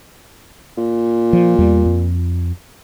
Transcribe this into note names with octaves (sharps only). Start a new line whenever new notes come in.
A#2
F3
E2 G3
F2